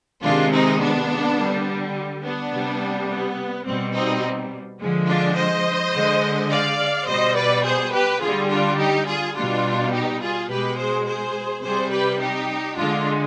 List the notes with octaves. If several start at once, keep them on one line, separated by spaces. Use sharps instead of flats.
C3 D#3 G#3 D4 F4
C4 D#4
B3 D4
D3 G3
B3 D4
C3 G3
B3
B2 G3 C4
C4 D#4
D3 F3 G#3
D4 F4
C5 D#5
D3 G#3
D5 F5
B2 G3 C5 D#5
B4 D5
G#4 C5
G4 B4
D3 G3 F4 G#4
D4 F4
D#4 G4
F4 G#4
B2 G3 D4 F4
D#4 G4
F4 G#4
B2 G#3 G4 B4
G#4 C5
G#4 C5
C3 G3 G#4 C5
G4 B4
D#4 G4
D3 G#3 D4 F4